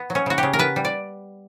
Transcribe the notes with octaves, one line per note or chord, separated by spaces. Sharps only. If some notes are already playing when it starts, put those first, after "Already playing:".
Already playing: B3
F#3
C#4
C#3 F#4
C#3 G4
A#4
B3 B4
G3
D5